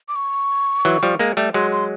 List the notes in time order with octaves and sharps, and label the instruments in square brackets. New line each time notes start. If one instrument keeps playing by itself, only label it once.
[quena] D6
C#6
[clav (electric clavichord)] E3 F#3
F3 G3
G#3 A#3
G3 A3
[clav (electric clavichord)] F#3 G#3 [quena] C6
[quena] C6